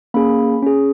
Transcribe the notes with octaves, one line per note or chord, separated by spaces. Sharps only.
A#3 C#4 G#4 B5
C#4 G#4